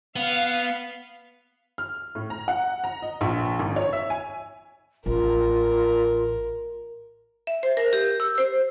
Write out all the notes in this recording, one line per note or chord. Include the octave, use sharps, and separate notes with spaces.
B3 F5
F6
A2
A#5
F#5
A#5
D#5
A#1
G#1
C#5
E5
G#5
A1 F4 A#4
E5
C5
A#4
G4
E6
C5